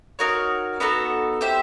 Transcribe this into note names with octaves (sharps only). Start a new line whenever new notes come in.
D#4 F#4 A#4 C#5
B3 D#4 F#4 A4
G4 C5 E5